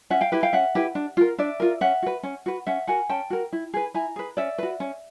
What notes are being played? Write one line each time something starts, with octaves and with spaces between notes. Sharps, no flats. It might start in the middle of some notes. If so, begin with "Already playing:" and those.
C#4 E5 F#5
F5 G5
E4 G4 B4
F5 G5
C#4 E5 F#5
E4 G4 B4
D4
F4 A#4
D4 D5 E5
F4 A#4
C#4 E5 F#5
F#4 B4
C#4
F#4 B4
C#4 E5 F#5
F#4 A#4 F#5 G#5
C#4 G5 A5
F#4 A#4
E4
G#4 B4
E4 G#5 A#5
G#4 B4
C#4 D5 E5
F#4 B4
C#4